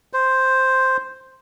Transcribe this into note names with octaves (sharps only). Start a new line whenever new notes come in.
C5